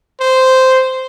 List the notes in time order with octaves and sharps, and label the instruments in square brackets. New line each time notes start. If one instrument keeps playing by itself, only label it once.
[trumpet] C5